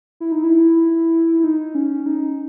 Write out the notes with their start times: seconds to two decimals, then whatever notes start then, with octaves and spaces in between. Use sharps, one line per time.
0.20 E4
0.32 D#4
0.44 E4
1.40 E4
1.44 D#4
1.75 C#4
2.06 D#4